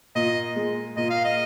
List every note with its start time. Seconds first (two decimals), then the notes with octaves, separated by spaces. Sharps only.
0.15 A#2 D#5
0.56 G#3
0.97 A#2 D#5
1.10 F5
1.24 D#5